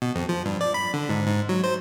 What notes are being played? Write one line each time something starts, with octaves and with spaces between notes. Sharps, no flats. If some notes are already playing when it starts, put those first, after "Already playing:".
B2
F2
F3
G2
D5
B5
D3
G#2
G#2
F#3
C5